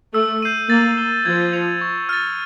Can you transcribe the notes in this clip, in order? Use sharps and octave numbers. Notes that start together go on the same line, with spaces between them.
A3 E6
G6 C7 D#7 F#7
A#3 A6
C7 E7 G7
F3 G#6
C#7 F7
C#6
F6 A6